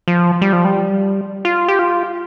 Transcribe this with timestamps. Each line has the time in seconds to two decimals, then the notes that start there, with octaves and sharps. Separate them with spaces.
0.08 F3
0.42 G3
0.53 F3
0.65 G3
1.45 F4
1.68 G4
1.79 F4